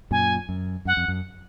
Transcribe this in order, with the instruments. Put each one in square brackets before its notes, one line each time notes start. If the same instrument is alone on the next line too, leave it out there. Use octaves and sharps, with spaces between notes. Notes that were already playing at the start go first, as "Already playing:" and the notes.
[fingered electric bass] F#2 A#2 [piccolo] G#5
[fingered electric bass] F#2
[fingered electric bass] F#2 [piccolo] F#5
[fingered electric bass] F2
F#2